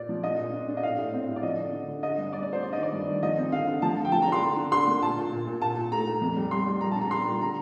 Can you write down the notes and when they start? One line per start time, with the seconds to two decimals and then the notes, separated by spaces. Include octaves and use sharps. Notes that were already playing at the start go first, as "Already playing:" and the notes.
Already playing: A#2 D5
0.09 F3
0.23 D4 D#5
0.39 A#2
0.53 D4
0.68 D4
0.77 D#5
0.83 A2 F5
0.98 A2
1.13 C4
1.28 A2
1.36 D5
1.43 F3 D#5
1.58 D3
1.73 D3
1.88 D3
2.03 D4 D#5
2.18 G2
2.33 D4 D5
2.43 D5
2.48 D4 C5
2.63 D4 D5
2.73 D#5
2.77 D#3
2.83 D5
2.93 G2
3.07 D#3
3.23 F3 D#5
3.38 C4
3.52 D3 F5
3.67 D3
3.82 F3 A5
3.97 F3
4.05 G5
4.12 F3 A5
4.22 A#5
4.27 D4
4.32 C6
4.42 D3
4.57 D3
4.72 D3 C6
4.87 A#3
5.02 A#2 A5
5.17 A#2
5.32 A#2
5.47 A#2
5.61 A#2 A5
5.77 A#2
5.92 A3 A#5
6.07 A3
6.22 F2
6.36 G3
6.51 G3 C6
6.66 G3
6.81 A#2 A#5
6.91 A5
6.96 D4
7.01 A#5
7.11 G3 C6
7.26 A#2
7.41 D3 A#5